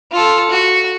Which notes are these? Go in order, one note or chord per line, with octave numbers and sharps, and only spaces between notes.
F4 A4
F#4